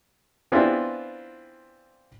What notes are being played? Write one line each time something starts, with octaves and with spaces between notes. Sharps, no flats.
E3 B3 C4 D4 E4 F4